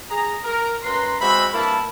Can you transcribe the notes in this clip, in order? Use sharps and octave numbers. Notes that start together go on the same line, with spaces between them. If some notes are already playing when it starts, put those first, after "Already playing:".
G#4 A#5
A#4
F#2 B4 A#5 C6
G#3 C4 F#4 E5 B5
G2 A#3 E4 A5 B5